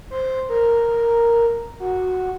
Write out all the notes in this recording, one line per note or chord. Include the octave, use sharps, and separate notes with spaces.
C5
A#4
F#4